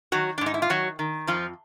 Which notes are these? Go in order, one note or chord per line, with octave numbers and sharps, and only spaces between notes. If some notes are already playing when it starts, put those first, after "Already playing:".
D#3 F#3 F#4
D4
G#2
D#4
E4
F4
D#3 F#3 F#4
D#3
F2 F3 F4